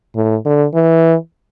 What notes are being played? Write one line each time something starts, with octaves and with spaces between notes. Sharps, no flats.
A2
D3
E3